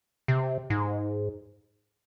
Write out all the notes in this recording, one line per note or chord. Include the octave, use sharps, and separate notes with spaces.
C3
G#2